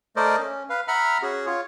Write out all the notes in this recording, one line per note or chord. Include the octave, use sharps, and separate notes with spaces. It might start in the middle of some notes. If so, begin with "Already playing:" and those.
A3 A#4 C5 D5 D#5
C#4
B4 F5
E5 F#5 A#5 B5 F6
C#4 F#4 G#4
F4 C#5